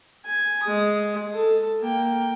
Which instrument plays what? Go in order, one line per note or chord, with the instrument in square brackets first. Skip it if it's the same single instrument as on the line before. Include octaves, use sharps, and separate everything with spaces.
[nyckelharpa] G#5
G#3 D#6
A4
A#3 G5